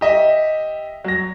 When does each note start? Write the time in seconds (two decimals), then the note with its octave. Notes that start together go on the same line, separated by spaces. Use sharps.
0.01 G4 D#5 E5
1.04 F#3 A#6